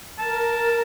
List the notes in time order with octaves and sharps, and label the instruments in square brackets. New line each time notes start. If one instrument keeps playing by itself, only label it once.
[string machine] A#4 [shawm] A5